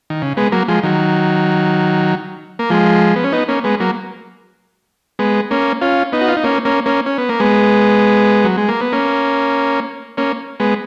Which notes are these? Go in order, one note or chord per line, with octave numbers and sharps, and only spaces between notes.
D#3
C#3
G#3 B3
F#3 A#3
F3 G#3
D#3 F#3
A#3
F3 G#3
B3
C#4
B3 D#4
A#3 C#4
G#3 B3
F#3 A#3
G#3 B3
A#3 C#4
C#4 F4
B3 D#4
F#4
F4
D#4
A#3 C#4
A#3 C#4
A#3 C#4
C#4
B3
A#3
G#3 B3
F#3
G#3
A#3
B3
A#3 C#4
A#3 C#4
G#3 B3